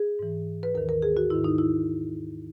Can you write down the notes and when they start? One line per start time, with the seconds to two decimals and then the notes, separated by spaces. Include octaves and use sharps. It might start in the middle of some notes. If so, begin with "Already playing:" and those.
Already playing: G#4
0.19 G#2 E3
0.63 B4
0.74 D#2 D#3 A#4
0.89 A#4
1.02 G#4
1.17 F#4
1.30 G#2 D#3 E4
1.44 D#4
1.58 E4